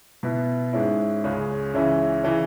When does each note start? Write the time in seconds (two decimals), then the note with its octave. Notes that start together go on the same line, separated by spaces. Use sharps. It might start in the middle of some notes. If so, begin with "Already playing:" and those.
0.23 B2 B3 E4
0.73 G#2 G#3 C#4 E4
1.24 C#2 C#3 G#3 C#4
1.73 C#2 C#3 E3 C#4 E4
2.24 C#3 E3 C#4